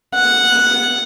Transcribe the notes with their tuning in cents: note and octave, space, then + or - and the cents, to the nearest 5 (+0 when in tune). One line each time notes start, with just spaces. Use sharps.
F#5 -5